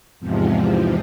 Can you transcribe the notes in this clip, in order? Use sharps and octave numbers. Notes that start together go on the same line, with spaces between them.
E2 G#2 C3 F3